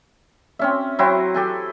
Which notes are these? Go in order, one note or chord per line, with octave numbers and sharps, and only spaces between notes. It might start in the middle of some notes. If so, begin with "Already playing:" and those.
C4 C#4 E5
F#3 C4 E4 F#4
G4 A4 G#5